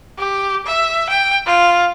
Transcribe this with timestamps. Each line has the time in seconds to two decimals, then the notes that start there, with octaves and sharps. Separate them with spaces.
0.18 G4
0.66 E5
1.10 G5
1.46 F4